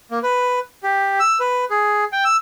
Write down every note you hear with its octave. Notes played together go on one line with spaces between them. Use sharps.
A#3
B4
G4
E6
B4
G#4
G5
E6